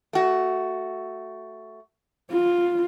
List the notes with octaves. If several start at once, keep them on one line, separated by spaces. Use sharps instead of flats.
A3 F#4
F4